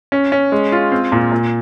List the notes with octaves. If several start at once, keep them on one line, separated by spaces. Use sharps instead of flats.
C#4
C#4
G#3
F4
C4
A#2
A#2